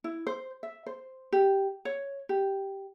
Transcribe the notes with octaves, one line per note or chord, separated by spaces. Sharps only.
E4
C5
E5
C5
G4
C#5
G4